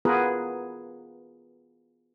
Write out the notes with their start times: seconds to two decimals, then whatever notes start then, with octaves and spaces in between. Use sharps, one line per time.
0.05 B3 F4 G#4 A#4 B4